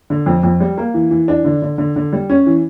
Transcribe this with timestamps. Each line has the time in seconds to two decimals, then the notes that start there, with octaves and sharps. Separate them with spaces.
0.10 D3
0.26 F2
0.43 F2
0.60 G3
0.77 A#3
0.94 E3
1.11 E3
1.28 D4
1.45 D3
1.62 D3
1.78 D3
1.96 D3
2.13 G3
2.30 C#4
2.46 E3